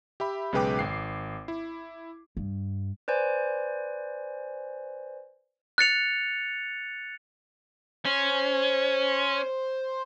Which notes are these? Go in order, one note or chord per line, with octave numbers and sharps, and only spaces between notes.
G4 E5 B5
B1 C#3 G#3 B4 G5 D6
G#1 C7
E4
G2
B4 C5 D5 G#5
F#6 A6 C#7 F7
C#4 C5